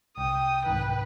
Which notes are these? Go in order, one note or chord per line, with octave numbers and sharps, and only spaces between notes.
C2 G5 D#6
C2 G#2 D#3 B4